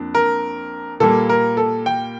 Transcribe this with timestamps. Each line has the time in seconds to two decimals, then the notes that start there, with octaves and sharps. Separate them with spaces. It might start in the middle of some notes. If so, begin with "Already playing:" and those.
Already playing: F2 A#3 D4
0.15 A#4
1.00 A#2 G3 A#3 A4
1.29 A#4
1.57 A4
1.86 G5